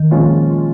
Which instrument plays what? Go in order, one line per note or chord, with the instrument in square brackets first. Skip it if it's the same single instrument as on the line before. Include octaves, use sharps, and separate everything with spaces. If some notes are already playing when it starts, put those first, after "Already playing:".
Already playing: [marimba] D#3
[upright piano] A#2 F3 G#3 C#4 F4